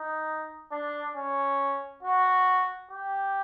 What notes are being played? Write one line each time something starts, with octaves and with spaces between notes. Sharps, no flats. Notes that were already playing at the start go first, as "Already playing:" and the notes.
Already playing: D#4
D4
C#4
F#4
G4